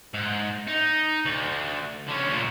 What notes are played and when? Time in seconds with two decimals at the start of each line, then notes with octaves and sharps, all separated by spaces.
0.14 G#2
0.68 D#4
1.25 D2
2.08 D3 C#4
2.28 D2 A#2